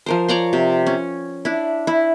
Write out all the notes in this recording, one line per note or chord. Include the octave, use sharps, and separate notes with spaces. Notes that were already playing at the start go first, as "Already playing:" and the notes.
F3 A#4 C5
C#5 D5 A#5 C6
C3
C#4
D4 E4
E4